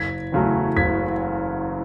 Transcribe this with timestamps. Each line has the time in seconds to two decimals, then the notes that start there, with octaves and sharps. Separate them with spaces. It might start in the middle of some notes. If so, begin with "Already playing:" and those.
Already playing: F#1 G#6 B6
0.32 E2 C#3 F#3 A3
0.76 F#1 G#6 B6